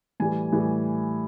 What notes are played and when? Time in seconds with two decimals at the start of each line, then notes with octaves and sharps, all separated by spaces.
0.20 A2 E3 G3 G#5
0.52 A2 E3 G3